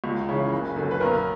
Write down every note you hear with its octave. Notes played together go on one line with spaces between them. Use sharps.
C#2
C#3 E3
F#1
F#2 D3
B4
B1 A#4